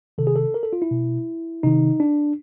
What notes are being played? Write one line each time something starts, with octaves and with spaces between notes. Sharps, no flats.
C3 D#3 A4
G#4
A4
A#4
A4
F4
E4
B2
C3 D#3 D#4
D4